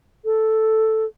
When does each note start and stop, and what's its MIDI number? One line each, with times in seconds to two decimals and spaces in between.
0.25 1.05 69